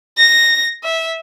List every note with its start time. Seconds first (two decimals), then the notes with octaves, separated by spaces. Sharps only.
0.18 A#6
0.84 E5